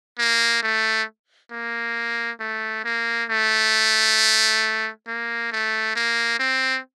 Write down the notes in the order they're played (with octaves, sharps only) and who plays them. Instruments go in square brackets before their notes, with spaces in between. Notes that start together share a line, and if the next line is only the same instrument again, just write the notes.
[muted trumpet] A#3
A3
A#3
A3
A#3
A3
A#3
A3
A#3
C4